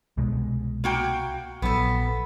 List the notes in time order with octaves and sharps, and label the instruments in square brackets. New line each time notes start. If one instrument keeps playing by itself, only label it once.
[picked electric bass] C2 B2 G#3
[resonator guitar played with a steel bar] A#3 F#4 G5
[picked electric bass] A#1 F#3 [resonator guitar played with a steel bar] B3 A4